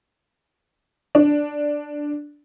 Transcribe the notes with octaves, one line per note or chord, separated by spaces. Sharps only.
D4